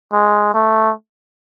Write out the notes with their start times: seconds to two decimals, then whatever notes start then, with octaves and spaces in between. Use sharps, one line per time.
0.13 G#3
0.54 A3